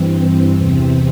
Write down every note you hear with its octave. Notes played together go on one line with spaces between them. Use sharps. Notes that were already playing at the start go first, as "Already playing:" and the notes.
Already playing: G2 E3 C4
E2 C3 E3 C4